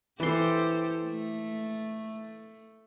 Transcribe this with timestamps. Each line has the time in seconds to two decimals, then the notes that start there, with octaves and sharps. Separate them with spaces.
0.20 E3 G4 A4 C5 C6
1.04 A3